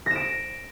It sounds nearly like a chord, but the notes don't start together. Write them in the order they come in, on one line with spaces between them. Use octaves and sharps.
A#6 E7 D7